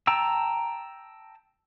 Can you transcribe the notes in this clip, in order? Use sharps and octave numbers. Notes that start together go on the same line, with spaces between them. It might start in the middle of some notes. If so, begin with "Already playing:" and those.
G5 A5 A#5 E6